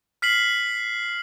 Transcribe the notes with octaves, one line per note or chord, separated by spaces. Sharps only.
F6 B6 C7 F#7